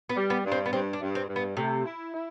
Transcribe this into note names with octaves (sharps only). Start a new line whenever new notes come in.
B3
G3
B3
G2
C4
B3
G2 C4
D4
G2
C4
G2
B3
C3 A3
E4
E4